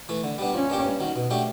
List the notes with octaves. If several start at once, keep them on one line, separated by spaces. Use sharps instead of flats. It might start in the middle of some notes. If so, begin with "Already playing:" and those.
E3 A3
D3
G3 B3 D4
F3 C#4
A#3 D4 G4
G2
D#3 F#3
B2
F#3 A3 D4 G4